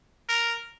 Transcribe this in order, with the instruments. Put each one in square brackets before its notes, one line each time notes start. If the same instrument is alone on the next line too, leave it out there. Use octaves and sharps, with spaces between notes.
[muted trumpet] A#4